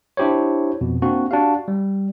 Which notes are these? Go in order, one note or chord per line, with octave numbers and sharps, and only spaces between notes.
D4 E4 G4 C5 C#5
F2 B2
A#3 C4 D4 F#4
D4 F#4 G4 F5
G3